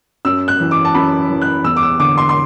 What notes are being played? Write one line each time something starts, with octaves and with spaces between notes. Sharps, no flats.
F#2 E6
F#6
E3
D6
A5
F#2 B5
E3
F#6
E2 E6
D6
E6
D3 D6
C6
C6